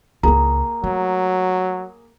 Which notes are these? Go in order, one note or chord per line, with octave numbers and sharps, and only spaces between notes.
C#2 A#3 E4 G#4 A#5
F#3 A3